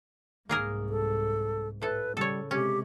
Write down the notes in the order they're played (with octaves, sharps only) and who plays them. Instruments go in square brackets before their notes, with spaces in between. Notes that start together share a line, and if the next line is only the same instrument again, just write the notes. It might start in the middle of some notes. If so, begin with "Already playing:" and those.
[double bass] C2 G#2 [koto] A#3 G#4 A#4
[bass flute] A4
[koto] A2 A4 [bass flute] B4
[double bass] C#3 [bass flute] G3 [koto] A4 C#5
[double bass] C3 G#3 [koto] C#4 [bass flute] G4